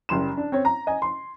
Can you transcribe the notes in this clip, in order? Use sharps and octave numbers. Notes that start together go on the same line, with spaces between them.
F#1 G3 C6 E7
D4
C4 C#4 C#5
A#5
D#5 G#5
C6